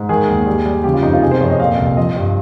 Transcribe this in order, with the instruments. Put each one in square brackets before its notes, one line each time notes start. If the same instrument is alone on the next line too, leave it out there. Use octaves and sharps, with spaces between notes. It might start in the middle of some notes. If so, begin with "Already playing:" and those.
Already playing: [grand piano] G#2
D#3 G#4
D#2
G3
G3
C#3 G4
F4
F2 D#4
F4
C3 G#4
C5
F2 C#5
D#5
A#2 F5
C2
F3 D#5
G2